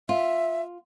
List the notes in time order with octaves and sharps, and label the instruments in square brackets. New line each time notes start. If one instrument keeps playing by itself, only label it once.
[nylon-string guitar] F4 [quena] E5